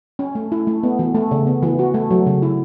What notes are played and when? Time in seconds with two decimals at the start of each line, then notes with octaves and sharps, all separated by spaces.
0.19 C#4
0.35 A3
0.52 E4
0.67 A3
0.83 B3
0.99 E3
1.15 A3
1.31 C#3
1.47 B3
1.63 E3
1.79 F#4
1.94 A3
2.11 F#3
2.26 C#3
2.42 E4